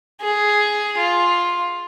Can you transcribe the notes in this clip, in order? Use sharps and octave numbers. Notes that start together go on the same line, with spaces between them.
G#4
F4